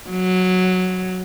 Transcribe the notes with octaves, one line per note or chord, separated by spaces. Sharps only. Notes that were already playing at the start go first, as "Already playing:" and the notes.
F#3